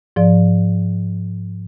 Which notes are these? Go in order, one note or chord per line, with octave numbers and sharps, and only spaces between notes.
G#2 F3 D5